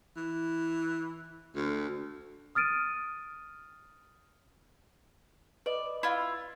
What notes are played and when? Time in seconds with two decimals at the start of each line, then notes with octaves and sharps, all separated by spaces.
0.17 E3
1.55 D2
2.55 D#6 F6 A6 D7 D#7
5.66 B4 D5 D#5
6.03 E4 F4